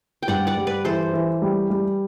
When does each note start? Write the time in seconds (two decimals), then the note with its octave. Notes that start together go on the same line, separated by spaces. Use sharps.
0.22 G5
0.28 G2 D5 F#5
0.47 D5 F#5
0.57 G3
0.67 B4 D5
0.85 E3 A4 C5
1.13 E3
1.42 G3
1.70 G3